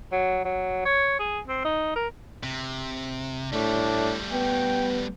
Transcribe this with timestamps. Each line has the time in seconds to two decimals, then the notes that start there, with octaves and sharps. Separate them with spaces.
0.12 F#3
0.45 F#3
0.85 C#5
1.19 G#4
1.47 C4
1.65 D#4
1.96 A#4
2.43 C3
3.53 A2 G3 A3 D4
4.32 B3 G5